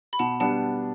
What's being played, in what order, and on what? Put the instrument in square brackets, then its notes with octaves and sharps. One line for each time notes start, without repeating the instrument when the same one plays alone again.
[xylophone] B5
[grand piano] B2 [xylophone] F#5 A5
[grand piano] G3 B3 D4 [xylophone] F#5 A5